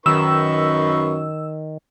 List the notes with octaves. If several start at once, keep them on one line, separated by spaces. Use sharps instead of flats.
F#2 D#3 D#4 B4 C#6 E6